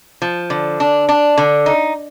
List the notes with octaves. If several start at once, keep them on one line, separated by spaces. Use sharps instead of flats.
F3
D3
D4
D4
D3
D#4